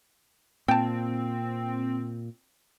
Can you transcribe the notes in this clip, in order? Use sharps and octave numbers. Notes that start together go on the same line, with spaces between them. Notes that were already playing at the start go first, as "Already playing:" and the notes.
A#2 C4 G5 A5